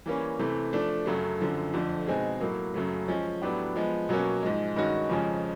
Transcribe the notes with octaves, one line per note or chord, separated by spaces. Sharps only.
E3 G3 A#3 C#4
C3 E3 A3
F3 A3 D4
F#2 C#3 F#3 A3
F#2 D3 F3
F2 D3 F3 A3
B2 G#3 C4 D#4 G#4
A2 F#3 A#3
F#2 C#3 F#3 A3
F3 G#3 C#4
A2 F#3 B3 D4 G4
F3 G#3 B3
B2 F#3 A#3 C#4
G#2 F3 G#3
G2 D#3 G#3 C#4 F#4
F2 C#3 F3 G#3 C#4